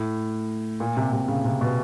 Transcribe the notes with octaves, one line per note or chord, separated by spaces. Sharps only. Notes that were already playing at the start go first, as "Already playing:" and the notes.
Already playing: A2
A#2
C3
C3
C#3
C3
B2